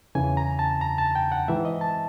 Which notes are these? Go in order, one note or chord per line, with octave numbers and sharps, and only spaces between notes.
E2 C#3 E3 G#5
A#5
A5
A#5
A5
G5
F#5
G#2 E3 E5
D#5
A5